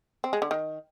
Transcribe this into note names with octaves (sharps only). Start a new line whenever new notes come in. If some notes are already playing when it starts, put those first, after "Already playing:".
C4
G#3
D3
D#3